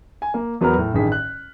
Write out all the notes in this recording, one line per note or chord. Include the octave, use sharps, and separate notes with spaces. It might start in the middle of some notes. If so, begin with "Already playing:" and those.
G#5
A#3
E2 F#3 B3 A#4 A#5 F6
A2
A1 G2 D#3 G#4 B6
F#6